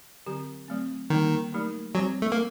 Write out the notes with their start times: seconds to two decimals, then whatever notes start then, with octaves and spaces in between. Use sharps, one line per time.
0.26 D3 F#3 C4 G4
0.68 F#3 A3 C4
1.10 D3 D#3 G3 A#3
1.53 F#3 A3 D#4 G4 A#4
1.95 F#3 G3 C4 G4 C5
2.22 A3
2.32 A#3